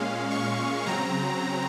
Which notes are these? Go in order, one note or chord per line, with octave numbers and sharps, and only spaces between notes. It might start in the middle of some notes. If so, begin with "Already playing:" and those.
Already playing: A#2 G#3 C#4 F5
C#6
C#3 F#3 C4 A#5